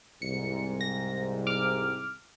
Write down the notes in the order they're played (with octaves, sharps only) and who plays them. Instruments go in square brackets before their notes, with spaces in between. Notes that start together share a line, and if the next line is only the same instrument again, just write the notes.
[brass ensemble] C2 G#2 [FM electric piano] C#7
[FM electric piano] A#6
D6 F6